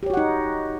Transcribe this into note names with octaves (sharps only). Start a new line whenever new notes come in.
D#4 F#4 G4 C#5 F#5